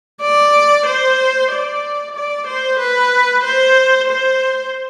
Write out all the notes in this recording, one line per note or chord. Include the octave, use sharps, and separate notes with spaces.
D5
C5
D5
D5
C5
B4
C5
C5